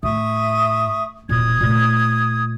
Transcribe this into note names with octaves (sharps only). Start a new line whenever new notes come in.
A2 E5 C#6 D#6
E1 A#2 D#6 G#6
A#2 A3